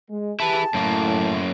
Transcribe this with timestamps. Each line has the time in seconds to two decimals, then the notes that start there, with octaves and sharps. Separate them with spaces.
0.10 G#3
0.40 E4 G4 G#4 B4 A5
0.74 F#2 A2 A#3